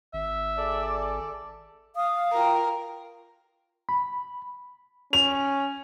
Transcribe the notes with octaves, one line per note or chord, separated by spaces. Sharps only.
G#1 E5
G#4 A4 D5
F5 D#6
F4 F#4 A#4 G5
B5
C#4 F7